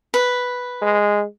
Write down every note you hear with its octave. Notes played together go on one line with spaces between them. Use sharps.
B4
G#3